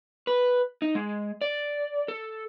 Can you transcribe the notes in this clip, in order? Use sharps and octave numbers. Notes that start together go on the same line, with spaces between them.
B4
D#4
G#3
D5
A4